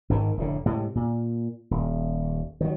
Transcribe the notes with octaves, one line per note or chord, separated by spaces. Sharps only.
G#1 G#2 D3 D#3
F1 A2 D3
A2 C3 G#3
A#2
D#1
D#3 F#3